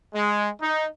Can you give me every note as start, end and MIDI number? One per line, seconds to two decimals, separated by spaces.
0.15 0.50 56
0.62 0.86 63